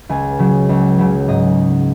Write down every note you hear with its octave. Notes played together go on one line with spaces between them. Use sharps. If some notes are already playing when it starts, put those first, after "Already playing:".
C#2 G#5
C#3 F#3
C#2
C#3 F#3
G#2 D#5